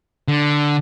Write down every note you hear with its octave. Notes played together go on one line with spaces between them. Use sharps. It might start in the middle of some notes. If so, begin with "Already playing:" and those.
D3